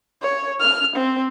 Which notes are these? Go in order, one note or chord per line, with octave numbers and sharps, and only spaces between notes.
C#5
F6
C4